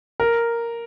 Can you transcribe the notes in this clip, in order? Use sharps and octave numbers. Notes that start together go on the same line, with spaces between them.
A#4